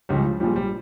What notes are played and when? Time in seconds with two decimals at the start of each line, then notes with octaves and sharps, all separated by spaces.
0.09 C#2 C#3 F3 G3
0.25 F3
0.40 A#1 A#2 F3 G3
0.56 G3